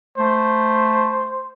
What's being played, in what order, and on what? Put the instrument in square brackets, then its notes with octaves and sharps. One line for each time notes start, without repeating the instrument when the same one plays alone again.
[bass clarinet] A3 [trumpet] C5